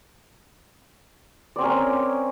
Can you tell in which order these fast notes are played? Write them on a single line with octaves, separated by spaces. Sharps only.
D5 C4 C#4 A#4